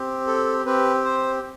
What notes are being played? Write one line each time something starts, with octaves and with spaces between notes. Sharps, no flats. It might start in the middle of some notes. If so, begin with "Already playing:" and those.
Already playing: C4 G4
A4
C4 G4 B4
C5